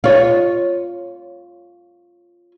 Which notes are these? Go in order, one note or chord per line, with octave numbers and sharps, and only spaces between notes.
F4 C#5